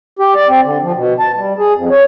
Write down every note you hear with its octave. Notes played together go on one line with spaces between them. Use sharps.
G4
D5
C4
D3
F3
B2
A5
G3
G#4
F2
C#5